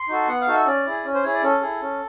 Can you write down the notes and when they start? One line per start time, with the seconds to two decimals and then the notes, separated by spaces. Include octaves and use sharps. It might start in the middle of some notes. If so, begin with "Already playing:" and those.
Already playing: C6
0.09 D#4 F#4 A4
0.28 B3 F#5
0.41 F5
0.48 D#4 F#4 A4
0.54 E5
0.66 C#4 D5
0.86 E4 G#4
1.04 C#4
1.14 C5
1.23 E4 G#4 C#5
1.34 D5
1.43 C#4 A4
1.61 E4 G#4
1.81 C#4